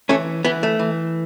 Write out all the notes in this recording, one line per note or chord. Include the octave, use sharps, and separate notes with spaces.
E3 A3 C#4
E3 B3
A3
E3